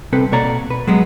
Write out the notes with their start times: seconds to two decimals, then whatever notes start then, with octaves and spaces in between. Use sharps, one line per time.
0.13 C2 C4 A4 B4
0.32 B2 A#3 A4 C#5 D5 A#5
0.70 B4
0.87 F#3 G#3 B3